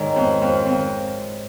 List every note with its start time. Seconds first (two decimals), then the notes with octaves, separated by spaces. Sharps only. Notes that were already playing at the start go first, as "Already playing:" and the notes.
Already playing: G#2 D#3 C#5
0.16 F2
0.42 F2
0.65 F2